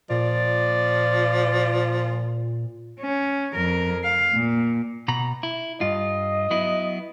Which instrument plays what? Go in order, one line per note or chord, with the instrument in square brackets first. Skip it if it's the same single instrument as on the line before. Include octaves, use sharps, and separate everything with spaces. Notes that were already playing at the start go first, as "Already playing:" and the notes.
[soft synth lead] A#2 [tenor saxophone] F3 [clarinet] D5
[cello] C#4
F2 A#4
F5
A#2
[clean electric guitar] B2 A#5 B5
E4
[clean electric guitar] G2 F4 [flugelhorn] D#5
[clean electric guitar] F#3 B3 E4